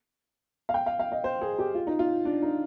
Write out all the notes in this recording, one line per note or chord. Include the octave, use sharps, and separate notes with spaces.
F5
G5
F5
F5
D#5
C5
G#4
G4
F4
D#4
F4
D4
D#4